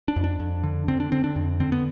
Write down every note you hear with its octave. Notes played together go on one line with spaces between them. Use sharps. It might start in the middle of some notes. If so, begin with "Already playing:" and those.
D4
F2
D4
F2
D3
D3 C4
D4
D3 C4
D4
F2
D3 C4
B3